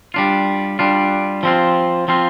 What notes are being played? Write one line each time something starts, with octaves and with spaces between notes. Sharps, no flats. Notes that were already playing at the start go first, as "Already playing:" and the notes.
G3 D4 F4
G3 D4 F4
F3 C4 F4
F3 C4 F4